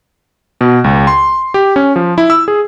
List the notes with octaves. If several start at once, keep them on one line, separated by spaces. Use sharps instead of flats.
B2
C#2
C6
G4
C#4
F3
E4
E6
G#4